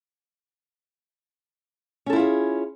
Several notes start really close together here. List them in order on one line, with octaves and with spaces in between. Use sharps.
C#4 A4 E4 F4 G#4